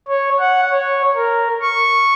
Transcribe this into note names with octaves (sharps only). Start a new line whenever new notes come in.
C#5
F#5
C#5
A#4
C#6